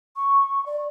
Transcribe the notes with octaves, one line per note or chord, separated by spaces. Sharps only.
C#6
D5